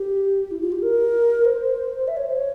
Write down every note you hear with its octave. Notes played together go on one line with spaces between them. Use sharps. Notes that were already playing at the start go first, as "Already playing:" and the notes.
Already playing: G4
E4
F4
G4
A#4
C5
E5
C#5
C5
C#5